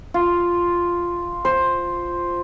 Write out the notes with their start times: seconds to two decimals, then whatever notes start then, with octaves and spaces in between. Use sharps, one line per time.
0.14 F4
1.45 C5